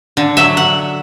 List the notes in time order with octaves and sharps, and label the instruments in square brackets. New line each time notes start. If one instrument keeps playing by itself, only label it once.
[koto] D3
F#3 E5
F#5